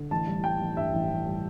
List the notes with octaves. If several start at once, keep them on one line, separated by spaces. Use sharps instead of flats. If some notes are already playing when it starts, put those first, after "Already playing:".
Already playing: D3
A1 A5
G3
G3 G5
A1
G2 E5
A1
A1
G3